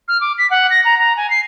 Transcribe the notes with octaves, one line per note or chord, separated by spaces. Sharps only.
F6
D6
B6
F#5
A#6
A#5
A#5
G#5
C7